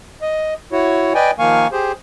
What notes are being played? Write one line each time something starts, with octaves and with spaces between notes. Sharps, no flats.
D#5
E4 F#4 C#5
B4 D5 D#5 G5 G#5
D#3 F3 A#3 F5 G#5 C#6
G4 G#4 C5